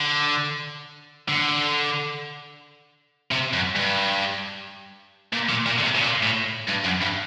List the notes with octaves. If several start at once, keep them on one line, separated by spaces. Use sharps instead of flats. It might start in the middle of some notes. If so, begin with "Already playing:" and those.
Already playing: D3
D3
C3
F#2
G2
A#2
A#2
A#2
D3
C3
A2
A#2
A2
G2
F#2
G2